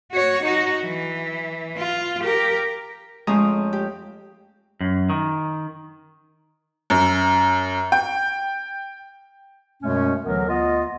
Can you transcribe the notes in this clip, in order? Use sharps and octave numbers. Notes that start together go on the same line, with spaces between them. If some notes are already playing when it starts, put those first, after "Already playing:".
F#4 C#5
D#4 F#4
E3
F4
G4 A#4
F2 G#3 A3 C#4 A#5 D#6
G4
F#2
D#3
F#2
G5
F#2 B2 G#3 A3 C#4
D2 D3 E3 F#3 B3 A#4
D2 B3 F4 D#5